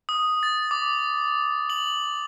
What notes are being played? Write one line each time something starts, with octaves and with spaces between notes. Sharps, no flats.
D#6
A6
D6
F#7